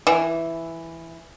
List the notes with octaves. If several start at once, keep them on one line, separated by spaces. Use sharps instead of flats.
E3